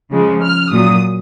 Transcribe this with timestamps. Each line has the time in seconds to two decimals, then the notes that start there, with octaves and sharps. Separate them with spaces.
0.11 C#3 F3 G#3
0.42 F6
0.71 A#2 F#3 D#6